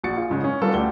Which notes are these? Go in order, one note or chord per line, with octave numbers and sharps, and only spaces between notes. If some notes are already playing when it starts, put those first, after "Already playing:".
A#1 F#4 A6 C#7
F4 G#4
G#2 C#3 G#3
C#4
G3 B3 C#4 F4 A4
D2 G4 D5 G7